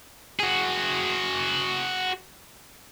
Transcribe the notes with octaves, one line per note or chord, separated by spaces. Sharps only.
F#4 G#4